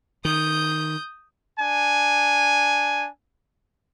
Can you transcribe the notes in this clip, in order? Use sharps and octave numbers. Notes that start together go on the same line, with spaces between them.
D#3 D#6 G6
D4 G#5